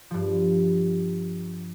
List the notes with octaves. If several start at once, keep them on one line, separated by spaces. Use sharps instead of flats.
G2 F3